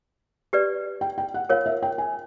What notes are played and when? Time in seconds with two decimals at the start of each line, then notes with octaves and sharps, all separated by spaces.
0.53 G4 B4 D5
1.01 G5
1.18 G5
1.34 F#5
1.49 F4 A#4 C#5 F5
1.66 E5
1.82 G5
1.98 G#5